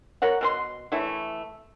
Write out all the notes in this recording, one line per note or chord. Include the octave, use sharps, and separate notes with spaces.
A#4 C#5 F#5
B2 C4 C6
E3 A3 E4 C#5